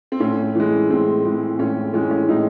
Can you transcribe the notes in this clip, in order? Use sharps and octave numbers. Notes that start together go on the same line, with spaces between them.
C4
A2 C#4
E3 G#3
A2 C4
E3 G#3
A2 C#4
E3 G#3 C#4
C#4
A2 D#4